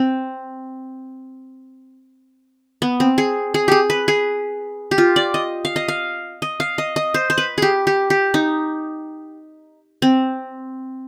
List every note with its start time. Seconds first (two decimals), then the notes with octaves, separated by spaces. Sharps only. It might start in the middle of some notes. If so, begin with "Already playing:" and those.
Already playing: C4
2.82 B3
3.00 C4
3.18 G#4
3.54 G#4
3.68 G4 G#4
3.90 B4
4.08 G#4
4.91 G4
4.98 F4
5.16 D5
5.34 D#5
5.65 F5
5.76 D#5
5.88 F5
6.42 D#5
6.60 F5
6.78 D#5
6.96 D#5
7.14 C5
7.30 C5
7.38 B4
7.58 G4 G#4
7.87 G4
8.10 G4
8.34 D#4
10.02 C4